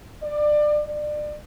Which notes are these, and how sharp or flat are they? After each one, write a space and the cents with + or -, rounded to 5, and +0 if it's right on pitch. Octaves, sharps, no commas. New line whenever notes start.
D5 +25
D5 +30